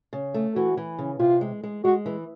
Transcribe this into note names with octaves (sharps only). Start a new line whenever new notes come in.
C#3
A3
E3 F#4
E3
C#3
C3 F4
G#3
G#3
G#3 F#4
E3